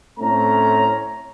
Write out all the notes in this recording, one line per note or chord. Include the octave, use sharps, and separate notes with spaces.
A2 A3 C4 C#4 A#5